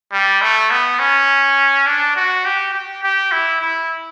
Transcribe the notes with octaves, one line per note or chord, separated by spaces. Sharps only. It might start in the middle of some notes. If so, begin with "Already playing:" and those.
G3
A3
B3
C#4
D4
F#4
G4
G4
G4
E4
E4